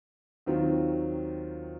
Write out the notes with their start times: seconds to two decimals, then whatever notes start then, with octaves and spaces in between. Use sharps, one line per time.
0.46 D#2 D#3 F#3 C4 F4